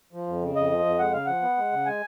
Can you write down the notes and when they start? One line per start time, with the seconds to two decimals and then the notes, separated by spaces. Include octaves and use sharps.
0.13 F3
0.27 F2
0.41 C#3
0.56 F2 D#5
0.71 F3
0.85 F2
0.99 G#3 F#5
1.13 C#3 F5
1.26 F3 F#5
1.42 B3
1.57 G#3
1.72 C#3
1.86 G#3 G#5